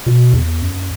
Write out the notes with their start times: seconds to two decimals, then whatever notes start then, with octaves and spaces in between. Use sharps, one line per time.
0.06 B2
0.33 E2
0.62 F#2